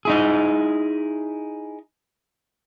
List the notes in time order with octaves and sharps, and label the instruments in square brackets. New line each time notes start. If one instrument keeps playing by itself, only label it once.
[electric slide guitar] D#4 E4 G#4